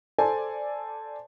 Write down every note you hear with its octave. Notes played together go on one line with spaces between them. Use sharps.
A4 C5 D5 G#5 A5